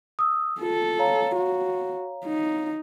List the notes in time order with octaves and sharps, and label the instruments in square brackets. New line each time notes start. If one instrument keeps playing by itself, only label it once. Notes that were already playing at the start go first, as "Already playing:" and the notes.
[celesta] D#6 E6
[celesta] F4 [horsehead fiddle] A4
[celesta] C#5 F5 A#5
[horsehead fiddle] F#4
D#4